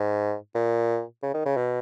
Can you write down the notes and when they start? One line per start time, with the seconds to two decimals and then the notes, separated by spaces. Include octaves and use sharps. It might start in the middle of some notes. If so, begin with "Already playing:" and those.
Already playing: G#2
0.55 A#2
1.22 C#3
1.34 D#3
1.46 C#3
1.57 B2